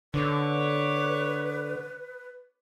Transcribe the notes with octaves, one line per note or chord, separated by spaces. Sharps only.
D3 B4 C#5 D6